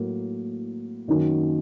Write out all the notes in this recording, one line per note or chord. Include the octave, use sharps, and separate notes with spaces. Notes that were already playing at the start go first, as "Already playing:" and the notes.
Already playing: A2 F#3 A#3
F#2 D#3 F#3 A#3 C#4